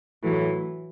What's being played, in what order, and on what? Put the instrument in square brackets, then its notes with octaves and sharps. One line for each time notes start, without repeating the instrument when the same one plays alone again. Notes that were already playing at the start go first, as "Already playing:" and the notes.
[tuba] A2 [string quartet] E3 F#3